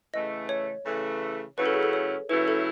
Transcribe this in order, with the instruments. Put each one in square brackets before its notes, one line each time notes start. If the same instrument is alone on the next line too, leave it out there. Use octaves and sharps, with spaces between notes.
[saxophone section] C#3 E3 A3 [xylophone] D#5
[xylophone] C#5
[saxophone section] C#3 E3 A3
[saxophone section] C#3 F#3 A3 C#4 E4 [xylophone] B4
[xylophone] A4
G#4
A4
C#5
[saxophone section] C#3 F#3 A3 C#4 E4 [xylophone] B4
[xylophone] A4